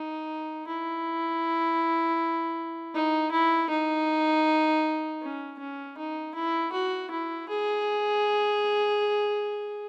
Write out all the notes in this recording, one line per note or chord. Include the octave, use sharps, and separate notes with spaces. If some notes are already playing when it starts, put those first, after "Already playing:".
Already playing: D#4
E4
D#4
E4
D#4
C#4
C#4
D#4
E4
F#4
E4
G#4